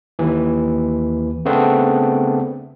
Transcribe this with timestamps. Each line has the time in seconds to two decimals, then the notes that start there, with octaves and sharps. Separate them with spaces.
0.19 D#2 E3
1.45 C#3 A3 B3 C4 D4